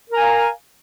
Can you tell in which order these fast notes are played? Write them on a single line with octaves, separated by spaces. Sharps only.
A#4 A#5 G#5 F5